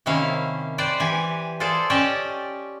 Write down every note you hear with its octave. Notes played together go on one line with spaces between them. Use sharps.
C3 D#3 A#3 C#4 E4 F5
B4 C5 D5 G5
E3 G4 G#5
F4 G#4 A4 C5 D5
C#4 G4 D5 D#5 G5 A5